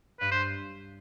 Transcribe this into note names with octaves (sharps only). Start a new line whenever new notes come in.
G2 B4
C5